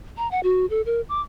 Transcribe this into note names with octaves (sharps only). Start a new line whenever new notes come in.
A#5
F#5
F#4
A4
A#4
D6